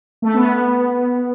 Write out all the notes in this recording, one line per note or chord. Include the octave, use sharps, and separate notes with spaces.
A3
B3